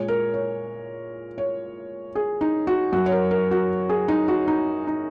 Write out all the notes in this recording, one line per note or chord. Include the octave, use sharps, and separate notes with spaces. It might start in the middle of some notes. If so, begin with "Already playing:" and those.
Already playing: A#2 G#3 C#5
A#4
C#5
C#5
G#4
D#4
F#4
F#2 F#3 F#4
C#5
A#4
A#4
F#4
G#4
D#4
F#4
D#4
D#4